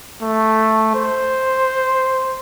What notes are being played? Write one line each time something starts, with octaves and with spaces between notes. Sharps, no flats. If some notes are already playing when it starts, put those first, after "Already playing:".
A3
C5